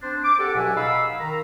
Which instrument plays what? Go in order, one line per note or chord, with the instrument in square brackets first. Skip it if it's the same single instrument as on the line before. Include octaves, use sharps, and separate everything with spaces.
[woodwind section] C4 D4 C5
D6
G4 A4 F#5
C#2 B2 F#3 E5 F#5 G#5
D#4 F5 B5 E6
D#3 A#5